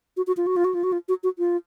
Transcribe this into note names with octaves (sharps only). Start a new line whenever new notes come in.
F#4
F#4
F4
F#4
F4
F#4
F4
F#4
F4
F#4
F#4
F4